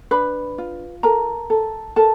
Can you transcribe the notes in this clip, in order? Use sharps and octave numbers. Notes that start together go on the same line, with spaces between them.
D4 B4 B5
F4
A4 A#4 A#5
A4
A4 A#4 A5